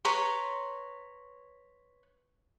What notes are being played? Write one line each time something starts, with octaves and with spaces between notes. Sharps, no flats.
B4 C#5 A#5 C6